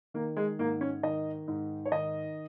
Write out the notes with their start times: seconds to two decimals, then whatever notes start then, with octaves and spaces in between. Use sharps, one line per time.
0.14 D#3 A#3
0.37 G#3
0.59 G#2 A#3
0.81 C#4
1.03 D#3 D#5
1.48 G#2
1.86 C#5
1.92 D#3 D#5